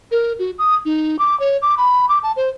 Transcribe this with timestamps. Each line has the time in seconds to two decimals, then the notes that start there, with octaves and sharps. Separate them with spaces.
0.11 A#4
0.39 F#4
0.59 D#6
0.85 D#4
1.19 D6
1.40 C#5
1.62 D6
1.78 B5
2.09 D6
2.23 A5
2.37 C5